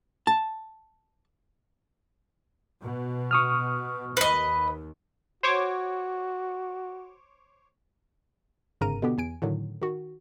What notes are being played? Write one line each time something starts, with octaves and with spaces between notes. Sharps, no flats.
A5
B2
C#6 D#6 F6
D#2 B4 D#5
F#4 C5 C#5 D6
G1 G#2 C#3 A#4 A#5 D#7
B2 D3 B3 G4
E2 G#5 D7
A2 D3 D#3 F#3
D#3 F#4